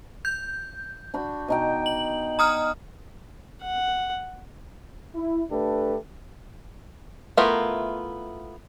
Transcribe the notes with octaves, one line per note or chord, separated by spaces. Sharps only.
G6
D4 F#4 B5
B2 D#4 G5
F#7
A#5 D#6 F6
F#5
E4
A3 D4 G4 A4 B4
A3 B3 E4 F4 A#4